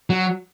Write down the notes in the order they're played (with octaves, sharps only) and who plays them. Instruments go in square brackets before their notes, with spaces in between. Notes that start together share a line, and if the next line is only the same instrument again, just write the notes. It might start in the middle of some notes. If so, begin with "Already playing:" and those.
[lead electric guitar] F#3